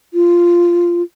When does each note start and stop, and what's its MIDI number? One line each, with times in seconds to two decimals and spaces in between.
0.14 1.02 65